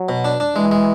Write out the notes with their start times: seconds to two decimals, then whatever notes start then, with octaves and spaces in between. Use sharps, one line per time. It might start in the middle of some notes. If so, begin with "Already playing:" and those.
Already playing: F#3
0.09 B2
0.25 D4
0.40 D4
0.56 E3 G#3
0.71 G#3